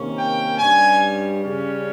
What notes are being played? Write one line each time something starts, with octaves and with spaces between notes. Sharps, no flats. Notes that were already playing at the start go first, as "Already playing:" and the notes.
Already playing: C3 D#3 A#3 C#4
G5
G2 G3 C#4 G#5
C#3 G3 C#4